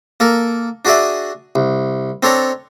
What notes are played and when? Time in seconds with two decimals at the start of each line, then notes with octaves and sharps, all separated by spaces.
0.20 A#3 A4 A#4
0.85 D4 F#4 G#4 D5 E5
1.56 C2
2.23 C4 D4 A4 C#5 A#5